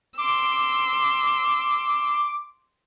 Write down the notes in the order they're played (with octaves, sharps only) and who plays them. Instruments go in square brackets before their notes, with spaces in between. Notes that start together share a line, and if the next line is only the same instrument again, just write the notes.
[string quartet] C6 E6 [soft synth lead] D6